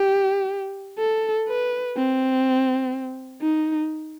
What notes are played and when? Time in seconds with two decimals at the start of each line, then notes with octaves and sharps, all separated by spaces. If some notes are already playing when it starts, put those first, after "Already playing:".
Already playing: G4
0.99 A4
1.48 B4
1.96 C4
3.41 D#4